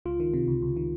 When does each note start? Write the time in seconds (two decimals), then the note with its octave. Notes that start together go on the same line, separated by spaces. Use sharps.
0.05 C#2 F4
0.20 D#3
0.33 C3
0.48 C#2
0.62 C#2
0.76 D#3